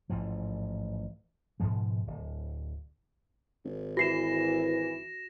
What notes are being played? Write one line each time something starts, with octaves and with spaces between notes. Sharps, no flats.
A1 G#2 E3 F3
G#2 B2 F3 G#3
D1
G#1
E3 F#4 A#6 C7 E7